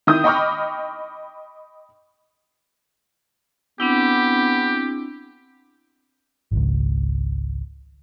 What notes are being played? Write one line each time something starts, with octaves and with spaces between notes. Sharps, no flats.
D#3 E4 D#6 G6
D#5 G5 B5 C#6 D6 F6
B3 C4 D4 E4 G4
G#1 C#2